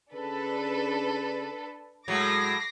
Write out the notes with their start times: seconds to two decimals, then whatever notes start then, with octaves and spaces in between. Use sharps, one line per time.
0.13 C#3 D4 A4 B4
2.08 A2 F#3 G#3 D6 A#6 C7